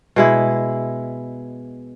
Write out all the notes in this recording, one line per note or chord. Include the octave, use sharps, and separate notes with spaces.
B2 G#3 E4